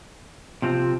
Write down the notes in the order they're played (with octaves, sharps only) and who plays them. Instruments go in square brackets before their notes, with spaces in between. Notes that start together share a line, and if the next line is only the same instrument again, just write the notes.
[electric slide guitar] C3 F3 C4